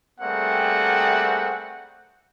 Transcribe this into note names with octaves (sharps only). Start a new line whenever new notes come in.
G3 A3 A#3 C4 G#4 F#5